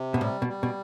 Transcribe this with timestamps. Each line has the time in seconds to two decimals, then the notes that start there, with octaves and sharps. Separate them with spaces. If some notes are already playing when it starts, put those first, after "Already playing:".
Already playing: C3
0.14 B2
0.21 A2 G3
0.42 B2
0.48 G3
0.63 B2